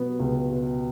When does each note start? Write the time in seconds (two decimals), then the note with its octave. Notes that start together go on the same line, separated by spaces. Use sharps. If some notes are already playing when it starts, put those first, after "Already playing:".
Already playing: B2 F#3 B3
0.20 C#2
0.51 B2